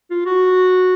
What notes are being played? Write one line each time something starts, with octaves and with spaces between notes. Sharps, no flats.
F4
F#4